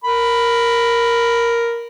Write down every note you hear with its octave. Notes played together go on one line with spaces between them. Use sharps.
A#4 B5